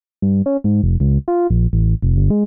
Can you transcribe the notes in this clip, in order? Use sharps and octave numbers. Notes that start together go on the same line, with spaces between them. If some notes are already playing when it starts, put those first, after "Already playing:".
G2
C#4
G#2
F1
C#2
F4
A#1
A1
F1
G1
G#3